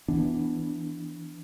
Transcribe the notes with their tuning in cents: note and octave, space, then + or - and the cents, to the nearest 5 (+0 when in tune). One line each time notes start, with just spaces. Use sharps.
E3 +0 B3 +0 D4 +0